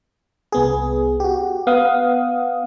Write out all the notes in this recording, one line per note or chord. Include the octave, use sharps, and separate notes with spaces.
C2 B3 G#4
F#4 G4
B3 F5 F#5 D#6